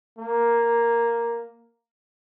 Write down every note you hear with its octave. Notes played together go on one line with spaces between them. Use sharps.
A#3